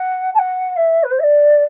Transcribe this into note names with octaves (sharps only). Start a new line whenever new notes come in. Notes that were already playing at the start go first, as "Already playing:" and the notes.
Already playing: F#5
A5
F#5
E5
B4
C5
E5
D5